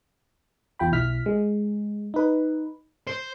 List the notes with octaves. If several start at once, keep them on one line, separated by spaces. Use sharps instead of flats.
E2 F4 G5 B5
B1 E4 F6 B6
G#3
D#4 B4
C5